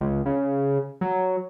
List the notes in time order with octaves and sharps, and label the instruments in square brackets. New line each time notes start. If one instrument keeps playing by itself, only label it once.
[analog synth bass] C#2
C#3
F#3